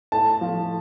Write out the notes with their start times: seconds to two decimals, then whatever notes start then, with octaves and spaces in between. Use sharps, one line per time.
0.12 A2 A5
0.41 F3